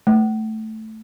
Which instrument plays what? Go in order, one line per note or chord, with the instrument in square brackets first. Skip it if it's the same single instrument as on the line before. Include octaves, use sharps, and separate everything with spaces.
[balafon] A3